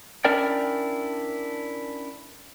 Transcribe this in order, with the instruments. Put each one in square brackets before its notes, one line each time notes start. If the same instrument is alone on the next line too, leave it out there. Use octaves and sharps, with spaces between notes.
[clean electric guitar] C#4 D4 E4 A#4 D5 G5